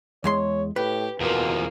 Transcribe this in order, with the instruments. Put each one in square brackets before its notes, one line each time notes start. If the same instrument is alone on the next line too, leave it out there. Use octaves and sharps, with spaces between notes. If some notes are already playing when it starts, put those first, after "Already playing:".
[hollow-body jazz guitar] E2 G#3 C6 [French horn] C#5
[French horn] A2 [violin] G4 [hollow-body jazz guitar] B4
[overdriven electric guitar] E2 F3 [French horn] B2 [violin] A#3